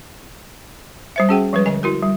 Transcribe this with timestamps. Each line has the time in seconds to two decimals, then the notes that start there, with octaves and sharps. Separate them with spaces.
1.16 G3 C5 E5
1.29 C#4 F#4 G#4 F#5 G5
1.53 F3 G3 G#3 B4
1.66 D3 D#5 G#5
1.83 E4 F#4 A#4
2.02 G3